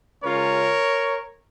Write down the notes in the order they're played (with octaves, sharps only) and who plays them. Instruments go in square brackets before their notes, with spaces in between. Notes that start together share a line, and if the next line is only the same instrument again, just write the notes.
[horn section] C#3 G#3 C#4 F4 A#4 C#5